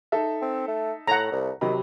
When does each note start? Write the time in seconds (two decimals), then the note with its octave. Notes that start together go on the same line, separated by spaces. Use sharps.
0.12 D#4 A4 E5
0.42 C4
0.68 A3
1.07 A2 F#5 A#5
1.32 C2
1.61 C3 D#3 F#3 B5